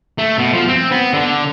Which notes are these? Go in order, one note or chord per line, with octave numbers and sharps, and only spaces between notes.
A3
B2
F3
C4
B3
D3